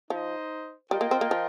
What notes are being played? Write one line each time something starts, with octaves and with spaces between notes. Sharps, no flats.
F3 D#4 C5 D#5
G3 F4 A#4 D#5 G5
A#3
C4
A#3
F3